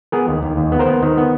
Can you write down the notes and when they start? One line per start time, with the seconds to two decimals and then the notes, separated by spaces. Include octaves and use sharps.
0.12 B3 G#4 A#4
0.28 D#2
0.43 D#2
0.57 D#2
0.72 B3
0.79 A#4 C5
0.87 B3
1.03 D#3
1.17 B3